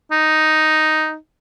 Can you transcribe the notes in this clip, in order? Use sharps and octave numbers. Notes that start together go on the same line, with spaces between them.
D#4